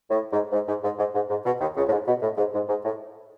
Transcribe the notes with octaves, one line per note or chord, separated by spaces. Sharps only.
A2
G#2
G#2
G#2
G#2
G#2
G#2
G#2
B2
D#2 D#3
C#2 C#3
A2
G#2
B2
A2
G#2
G#2
G#2
A2